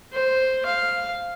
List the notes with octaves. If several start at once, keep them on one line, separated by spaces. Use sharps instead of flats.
C5
F5